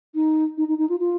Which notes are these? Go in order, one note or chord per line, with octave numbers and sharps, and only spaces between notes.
D#4
D#4
D#4
D#4
F4
F4